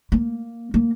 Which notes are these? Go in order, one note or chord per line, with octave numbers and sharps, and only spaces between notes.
A#3
A#3